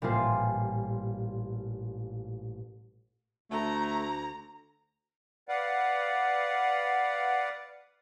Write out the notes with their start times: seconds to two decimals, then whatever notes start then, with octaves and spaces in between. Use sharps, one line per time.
0.02 A1 A#2 G3 F4 G#4 C5
3.51 D2 A3 A#5
5.49 B4 D5 F5 F#5